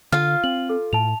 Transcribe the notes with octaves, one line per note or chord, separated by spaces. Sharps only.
D3 F4 F5 F6
C4 F#7
A4
A2 A5 F7